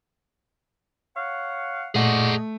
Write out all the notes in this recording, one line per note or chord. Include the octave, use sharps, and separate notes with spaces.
C#5 F5 F#5
A#2 A3 F#4 G#4 D5 D#5 F#5